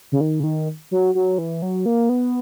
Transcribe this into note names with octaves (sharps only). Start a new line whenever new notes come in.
C#3
D#3
C#3
D#3
F#3
F#3
E3
F#3
A#3
B3